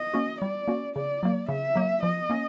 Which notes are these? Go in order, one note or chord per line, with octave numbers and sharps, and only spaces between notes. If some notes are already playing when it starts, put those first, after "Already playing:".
Already playing: D#5
A#3 C#4 F#4
G3 D5
A#3 C#4 F#4
C#3 D5
F#3 A#3
C#3 E5
F#3 A#3
F3 D#5
A#3 C#4